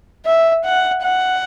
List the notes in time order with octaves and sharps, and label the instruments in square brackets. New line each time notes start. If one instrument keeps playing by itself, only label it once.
[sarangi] E5
F#5
F#5